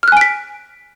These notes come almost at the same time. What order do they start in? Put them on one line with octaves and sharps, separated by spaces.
F6 F#6 G#5 D7 B6